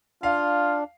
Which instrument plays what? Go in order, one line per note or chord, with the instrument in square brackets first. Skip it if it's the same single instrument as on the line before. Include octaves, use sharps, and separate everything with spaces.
[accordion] D4 [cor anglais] F4 [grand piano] F5